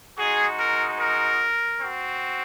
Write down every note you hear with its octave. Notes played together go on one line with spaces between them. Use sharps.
G#3 D#4 F#4 G#4
A#4
A#4
C4 F#4